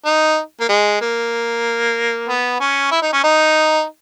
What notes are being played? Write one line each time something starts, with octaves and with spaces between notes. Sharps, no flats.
D#4
A#3
G#3
A#3
B3
C#4
E4
D#4
C#4
D#4